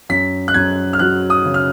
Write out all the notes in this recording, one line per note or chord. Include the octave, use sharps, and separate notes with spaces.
F#2 B6
F#6
F#2 G#6
F6
F#3 F#6
D#6
C#3
F6